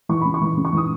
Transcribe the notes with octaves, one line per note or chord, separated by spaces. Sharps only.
E3 C#6
C#3 B5
C#6
E3
C#3
C#6
E3 D#6